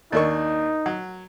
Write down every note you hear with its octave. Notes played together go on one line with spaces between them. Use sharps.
D#2 D4 D#4 A#4 D#5 C#6
F#3 F#5